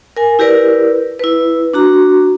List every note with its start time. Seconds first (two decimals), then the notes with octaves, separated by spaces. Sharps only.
0.17 A#4 G#5
0.39 E4 G4 A#4 B4 D5
1.19 E4 B4
1.74 D4 F#4 A#5